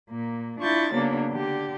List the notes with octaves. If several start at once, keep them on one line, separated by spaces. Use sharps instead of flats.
A#2 A#3
D4 E4 F4 C#6 G6 A6
C#3 F#3 A#3 B3 D4
D3 G4